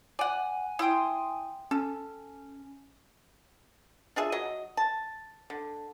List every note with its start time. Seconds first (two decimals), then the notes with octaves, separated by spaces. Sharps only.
0.19 D5 F#5 G#5
0.79 E4 G5 C6 D#6
1.71 C#4 A4
4.16 D4 F4 G#4 E5
4.32 F#3 D#5
4.77 A5
5.50 D3